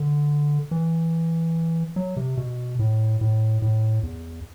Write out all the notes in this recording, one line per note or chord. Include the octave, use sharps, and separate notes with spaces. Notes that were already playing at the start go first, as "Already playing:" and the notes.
Already playing: D3
E3
F#3
C3
B2
A2
A2
A2
E2